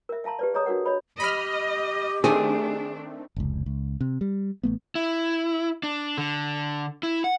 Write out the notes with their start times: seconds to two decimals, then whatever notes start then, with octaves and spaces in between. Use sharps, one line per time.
0.09 A#4 E5
0.24 E5 F5 A5 A#5 C6
0.39 G4 B4 D5
0.54 G#4 C#5 D#5 A#5 D#6
0.66 D4 F#4 A#4 F#5
0.86 C#5 D#5 B5
1.20 G4 D#5 B5 F6
2.24 D#3 A3 C4 D4 G#4
3.36 F1 C#2
3.66 C#2
4.01 C3
4.21 G3
4.63 A1 A3 B3
4.95 E4
5.83 D4
6.18 D3
7.03 E4
7.24 F#5